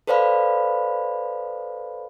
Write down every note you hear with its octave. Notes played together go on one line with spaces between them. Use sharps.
A4 B4 C5 D5 F5 B5